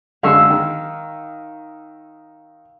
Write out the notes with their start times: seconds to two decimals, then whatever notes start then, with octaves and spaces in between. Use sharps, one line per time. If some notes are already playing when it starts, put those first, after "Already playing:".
0.23 F#2 D3 G#3 F5 C#6 E6
0.50 D#3